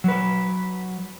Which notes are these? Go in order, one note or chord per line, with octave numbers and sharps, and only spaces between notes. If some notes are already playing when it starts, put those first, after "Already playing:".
F#3 B4